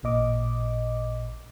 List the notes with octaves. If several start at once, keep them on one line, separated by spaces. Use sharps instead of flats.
A1 A#2 D#5 D6